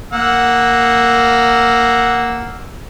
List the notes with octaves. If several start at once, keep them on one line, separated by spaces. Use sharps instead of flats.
A#3 F#5 E6